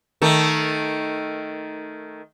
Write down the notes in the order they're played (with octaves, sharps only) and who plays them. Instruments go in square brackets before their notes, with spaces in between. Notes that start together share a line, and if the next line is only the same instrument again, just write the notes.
[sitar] D#3 A3